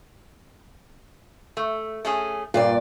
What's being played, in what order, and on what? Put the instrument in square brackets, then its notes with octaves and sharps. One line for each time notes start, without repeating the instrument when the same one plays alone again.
[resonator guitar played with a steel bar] A3
A3 C#4 G#4
[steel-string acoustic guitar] G2 A#2 D5 [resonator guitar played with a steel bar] F4